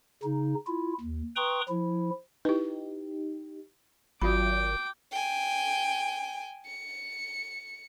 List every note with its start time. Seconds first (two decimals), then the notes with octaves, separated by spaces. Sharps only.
0.23 C#3 D#4
0.67 E4 F4
1.01 D#2
1.36 B4 G5 A#5 C6 C#6 D#6
1.69 F3 E4
2.45 D#4 E4 G4 B4
4.22 G#1 F#3 F4 F#4 D5 G5 B5 D6
5.11 G5 G#5
6.66 C#7